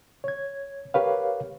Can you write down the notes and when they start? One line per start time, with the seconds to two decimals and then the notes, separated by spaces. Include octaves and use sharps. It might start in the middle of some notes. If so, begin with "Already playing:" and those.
0.24 C#5 G#6
0.94 G4 A#4 B4 C#5 F5